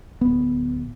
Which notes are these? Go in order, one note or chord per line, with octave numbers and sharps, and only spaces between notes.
D1 B3